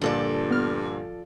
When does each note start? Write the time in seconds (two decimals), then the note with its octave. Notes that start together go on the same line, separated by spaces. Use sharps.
0.01 G2 A#2 D3 F3 A4 D5
0.50 B3 F6